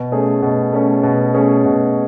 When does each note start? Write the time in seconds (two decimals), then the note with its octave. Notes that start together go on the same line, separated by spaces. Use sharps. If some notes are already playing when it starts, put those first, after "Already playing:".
Already playing: B2
0.12 A3 C#4 G#4
0.42 B2
0.73 A3 C#4 G#4
1.03 B2
1.34 A3 C#4 G#4
1.65 B2